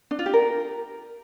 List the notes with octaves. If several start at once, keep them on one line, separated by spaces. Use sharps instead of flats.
D4
F4
G4
A#4